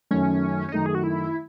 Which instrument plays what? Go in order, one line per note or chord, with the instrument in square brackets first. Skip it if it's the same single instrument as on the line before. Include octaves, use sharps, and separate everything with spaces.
[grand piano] F#2 D#3 A3 [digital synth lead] C#4
[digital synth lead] C#4
[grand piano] F#2 D#3 A3 [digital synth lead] D#4
[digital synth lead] G#4
F#4
E4